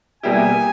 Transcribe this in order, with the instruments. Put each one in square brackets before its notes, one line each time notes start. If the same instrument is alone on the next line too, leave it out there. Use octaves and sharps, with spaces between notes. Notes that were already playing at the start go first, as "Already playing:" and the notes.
[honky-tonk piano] B2 G3 A#3 E4 G4 [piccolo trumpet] G#5